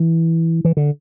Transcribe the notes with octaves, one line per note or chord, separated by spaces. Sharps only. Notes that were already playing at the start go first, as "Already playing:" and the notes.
Already playing: E3
E3
D3